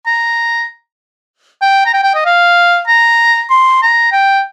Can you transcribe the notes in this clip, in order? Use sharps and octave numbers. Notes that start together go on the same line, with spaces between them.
A#5
G5
A#5
G5
G5
D#5
F5
A#5
C6
A#5
G5